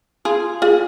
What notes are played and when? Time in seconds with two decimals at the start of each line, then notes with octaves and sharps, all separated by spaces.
0.25 F4 G#4
0.62 F4 G#4